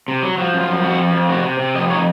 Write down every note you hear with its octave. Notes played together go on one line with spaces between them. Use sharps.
C3
F#3
F3 F#4
F#2
F4
F3
F2 F#4
F3
F2
C3 F#4
C3
C3
F2 D#5
D#4 C#5